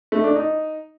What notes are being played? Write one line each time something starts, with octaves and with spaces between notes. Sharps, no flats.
A3
D4
D#4